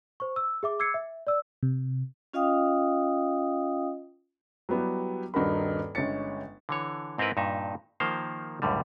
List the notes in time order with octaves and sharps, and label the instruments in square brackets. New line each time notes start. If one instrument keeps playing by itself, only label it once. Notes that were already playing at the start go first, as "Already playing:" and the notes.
[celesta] C5 C#6
E6
G#4 E5 D6
D6 E6 G#6 C7 C#7
E5
D5 E6
[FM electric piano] C3
[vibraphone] C#4 F4 D#5 F5 G5 D#6
[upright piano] F#3 G3 B3 E4 G4
D#1 G2 D#4 F#4 A#4 B5
G1 G#3 C#4 A6 C#7
[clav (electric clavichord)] D3 E3 C#5
G#2 C4 E4 A#4 B4
G2 A#2 D#4 E5
D#3 F3 A#3 C5 F5
C#2 F#2 A2 D3 G3